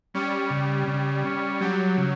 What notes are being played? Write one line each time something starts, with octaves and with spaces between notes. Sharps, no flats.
G3 C#4
C#3
C#3
C#4
F#3 G3
C#3